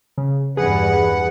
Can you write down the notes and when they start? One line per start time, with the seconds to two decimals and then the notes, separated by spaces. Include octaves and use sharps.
0.18 C#3
0.57 E2 G2 G#4 B4 F#5